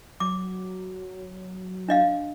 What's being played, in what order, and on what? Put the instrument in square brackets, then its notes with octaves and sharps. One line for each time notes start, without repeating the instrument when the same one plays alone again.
[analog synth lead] F#3 [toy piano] D6
[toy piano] D4 D#5 F5